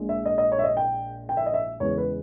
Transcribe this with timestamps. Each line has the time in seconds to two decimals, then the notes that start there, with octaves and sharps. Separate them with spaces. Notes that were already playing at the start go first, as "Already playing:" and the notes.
Already playing: A#1 A#2 G#3
0.09 E5
0.26 D#5
0.38 D#5
0.52 C#5
0.59 E5
0.64 D#5
0.77 G5
1.29 G5
1.37 E5
1.46 D#5
1.54 E5
1.80 E2 C#3 G#3 B3 C#5
1.97 B4